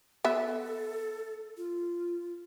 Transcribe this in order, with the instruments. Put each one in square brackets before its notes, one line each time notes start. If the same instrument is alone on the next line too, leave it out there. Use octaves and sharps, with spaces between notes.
[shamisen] B3 E5 [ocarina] A4
[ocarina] F4